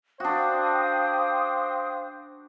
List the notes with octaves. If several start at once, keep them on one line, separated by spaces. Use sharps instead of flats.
D4 F#4 C5 F5 G5 D#6